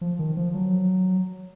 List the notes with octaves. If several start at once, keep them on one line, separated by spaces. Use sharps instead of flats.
F3
D#3
F3
F#3